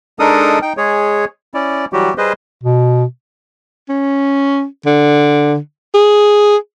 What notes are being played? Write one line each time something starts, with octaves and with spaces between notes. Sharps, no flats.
G#3 D4 D#4 A4 A#4 D#6
D#4 G5
G#3 G#4 C#5
C#4 E4 D5
E3 F#3 G3 F#4 G4
G3 G#4 B4 C5 D#5
B2
C#4
D3
G#4